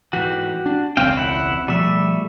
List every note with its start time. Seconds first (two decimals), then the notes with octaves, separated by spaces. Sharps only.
0.13 G#2 E3 F#4 G4
0.66 D4
0.97 E1 C#2 C4 F5 G5
1.17 E4 F#5
1.68 B2 F3 G3 A3 E5